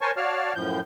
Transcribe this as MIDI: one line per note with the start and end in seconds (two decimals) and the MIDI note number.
0.01 0.11 70
0.01 0.11 72
0.01 0.11 73
0.01 0.11 80
0.01 0.11 81
0.01 0.11 85
0.17 0.53 66
0.17 0.53 73
0.17 0.53 74
0.17 0.53 77
0.17 0.53 81
0.17 0.53 89
0.55 0.80 42
0.55 0.80 45
0.55 0.80 53
0.55 0.80 91